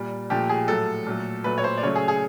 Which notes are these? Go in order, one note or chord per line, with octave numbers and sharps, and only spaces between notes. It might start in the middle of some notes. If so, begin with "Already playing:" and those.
Already playing: A#2 G3
A#2 F3 A3 G4
G#4
A2 F#3 A3 A4
A#2 F#3 A3
A#2 F#3 A3 B4
C#5
C5
D5
C#3 F#3 A3 C#5
G#4
G#4